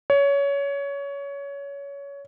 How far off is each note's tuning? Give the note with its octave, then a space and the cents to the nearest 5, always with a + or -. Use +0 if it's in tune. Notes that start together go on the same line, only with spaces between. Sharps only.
C#5 +20